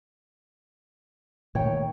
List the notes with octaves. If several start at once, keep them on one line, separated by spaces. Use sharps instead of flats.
A#2 D#3 A3 C#5 G5